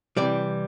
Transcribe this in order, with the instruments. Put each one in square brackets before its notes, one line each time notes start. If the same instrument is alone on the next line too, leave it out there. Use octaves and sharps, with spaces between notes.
[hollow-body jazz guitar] C3 E3 G3 D5